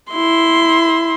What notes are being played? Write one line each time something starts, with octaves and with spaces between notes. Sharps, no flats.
E4 C6